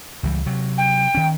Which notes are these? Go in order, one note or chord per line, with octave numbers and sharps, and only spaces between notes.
C#2 E3 G3
C3 F#3
G5
D#3 C#4